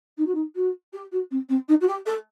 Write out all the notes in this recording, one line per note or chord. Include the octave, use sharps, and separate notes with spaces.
D#4
F#4
D#4
F#4
G4
F#4
C4
C4
D#4
F#4
G4
A4